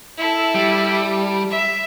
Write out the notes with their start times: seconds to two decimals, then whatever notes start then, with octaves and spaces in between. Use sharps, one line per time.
0.18 E4 A4
0.55 G3
1.50 E5